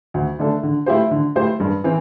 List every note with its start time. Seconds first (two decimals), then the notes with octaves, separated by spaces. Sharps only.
0.14 D2
0.39 D3 A3 D4 A4
0.63 D3
0.86 A3 E4 G4 C5
1.11 D3
1.35 A3 E4 G4 C5
1.60 G2
1.84 E3 C4